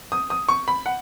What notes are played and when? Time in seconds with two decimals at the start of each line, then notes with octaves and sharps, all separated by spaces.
0.12 D#6
0.30 D#6
0.49 C#6
0.68 B5
0.86 F#5